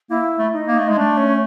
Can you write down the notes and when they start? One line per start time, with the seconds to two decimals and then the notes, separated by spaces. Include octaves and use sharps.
0.10 A#3 E4
0.38 A3
0.53 D#4
0.68 A#3
0.78 A3
0.89 G#3
0.95 A3 D4
1.17 C#4